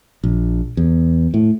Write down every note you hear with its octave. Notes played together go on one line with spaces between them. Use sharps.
A#1
E2
A2